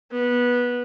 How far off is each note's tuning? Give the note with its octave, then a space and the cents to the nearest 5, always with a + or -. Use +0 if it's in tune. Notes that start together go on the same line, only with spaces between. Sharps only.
B3 -15